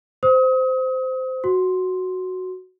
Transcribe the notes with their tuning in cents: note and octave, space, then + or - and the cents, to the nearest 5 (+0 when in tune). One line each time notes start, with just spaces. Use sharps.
C5 -15 D#6 +35
F#4 +0 C6 +0